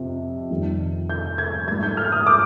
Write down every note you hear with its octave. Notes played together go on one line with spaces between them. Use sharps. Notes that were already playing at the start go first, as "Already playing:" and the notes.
Already playing: F2 C3
F2 D#3 G3
G6
G#6
G#2 G3 G#6
G6
F6
D#6
D6